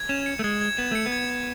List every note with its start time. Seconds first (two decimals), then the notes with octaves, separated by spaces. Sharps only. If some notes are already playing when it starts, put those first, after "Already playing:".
Already playing: G#6
0.09 C#4 E7
0.26 C#7
0.39 A3
0.44 G#3 G#6
0.61 G#6
0.77 B3 E7
0.92 A3 C#7
1.06 B3
1.12 G#6
1.30 G#6